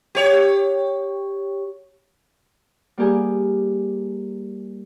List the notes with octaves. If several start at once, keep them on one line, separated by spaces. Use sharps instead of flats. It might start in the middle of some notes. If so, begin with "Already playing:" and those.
G4 C#5
G3 A#3 G4 G#4 G#5